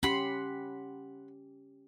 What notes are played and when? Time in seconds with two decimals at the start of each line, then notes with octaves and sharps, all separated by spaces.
0.03 C#4 G4 F#5 B5 C6